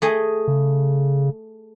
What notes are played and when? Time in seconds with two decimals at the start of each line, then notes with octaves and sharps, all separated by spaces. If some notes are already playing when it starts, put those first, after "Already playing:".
0.02 A3 G#4 D#5
0.48 C#3